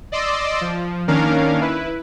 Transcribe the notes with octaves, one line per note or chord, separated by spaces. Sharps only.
D5 D#5 C6 D6 E6
F3
D#3 A#3 C#4 D4 A#4 F5
E4 B4